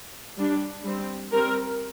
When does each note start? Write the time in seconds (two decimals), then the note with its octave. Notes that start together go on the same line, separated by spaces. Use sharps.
0.37 G3 D4
0.84 G3 C4
1.32 G3 C4 A#4